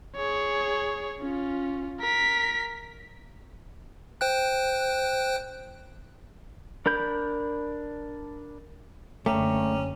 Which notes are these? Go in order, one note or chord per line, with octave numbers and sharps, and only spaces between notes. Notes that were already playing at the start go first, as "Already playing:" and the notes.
G#4 C#5
C#4 F4
A#4 B6
C5 G5 F#6
D4 A#4 B5 G6
F#1 D3 A3 C#4 G5 A#5 D6